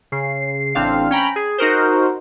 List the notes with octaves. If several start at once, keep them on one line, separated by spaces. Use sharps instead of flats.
C#3 C7
A1 C4 D4 F5
C#4 G5 A#5 B5
G#4
D#4 F#4 A#4 C5